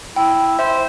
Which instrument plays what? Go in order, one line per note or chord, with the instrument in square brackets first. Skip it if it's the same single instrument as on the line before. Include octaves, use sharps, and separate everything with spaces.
[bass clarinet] E4 [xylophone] G5
[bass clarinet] C5 [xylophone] E5